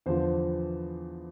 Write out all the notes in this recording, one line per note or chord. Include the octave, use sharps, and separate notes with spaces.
E2 D3 F3 C5